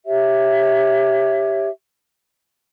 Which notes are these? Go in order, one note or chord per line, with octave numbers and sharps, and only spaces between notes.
G4 C#5 E5